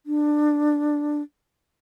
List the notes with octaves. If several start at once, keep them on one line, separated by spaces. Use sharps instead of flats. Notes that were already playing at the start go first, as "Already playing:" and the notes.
D4